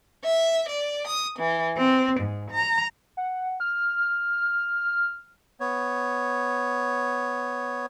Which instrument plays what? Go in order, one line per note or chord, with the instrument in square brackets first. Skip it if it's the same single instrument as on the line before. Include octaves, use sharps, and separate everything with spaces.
[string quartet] E5
D5
D#6
E3
C4
G#2
A#5
[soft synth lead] F#5
F6
[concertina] B3 C#5